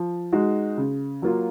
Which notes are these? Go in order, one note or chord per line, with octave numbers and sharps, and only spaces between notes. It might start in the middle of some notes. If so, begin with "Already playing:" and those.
Already playing: F3
G#3 D#4 F#4
C#3
F#3 A#3 F4